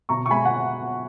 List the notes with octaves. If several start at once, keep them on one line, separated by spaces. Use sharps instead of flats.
B2 A#5 C#6
C#6
G#3 G#5 B5
F#5